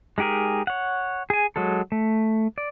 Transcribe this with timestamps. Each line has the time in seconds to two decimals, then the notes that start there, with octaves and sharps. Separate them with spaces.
0.18 G#3 D#4 G4 G#4 A#4
0.67 C#5 F#5
1.30 G#4 G#5
1.56 F#3 G#3 A4
1.92 A3
2.58 D5